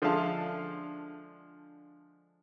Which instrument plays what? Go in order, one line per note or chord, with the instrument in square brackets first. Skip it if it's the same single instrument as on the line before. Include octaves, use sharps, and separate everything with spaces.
[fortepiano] D3 F3 G#3 E5 F5 A5